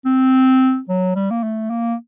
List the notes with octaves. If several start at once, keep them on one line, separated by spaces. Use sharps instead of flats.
C4
F#3
G3
A#3
A3
A#3